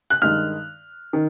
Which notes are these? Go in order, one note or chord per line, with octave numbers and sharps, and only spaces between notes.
F#6
G2 D#3 G#3 F6
D#3